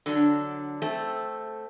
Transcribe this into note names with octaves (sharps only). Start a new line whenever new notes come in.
D3 F#3 D4
A3 C4 A4